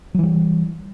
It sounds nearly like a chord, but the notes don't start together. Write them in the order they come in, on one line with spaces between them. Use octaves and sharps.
F#3 E3 G3